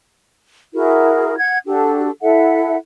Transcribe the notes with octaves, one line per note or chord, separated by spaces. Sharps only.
E4 F#4 G#4 A#4
F#5 G#6
D4 F#4 G4 A4
E4 A4 E5 F#5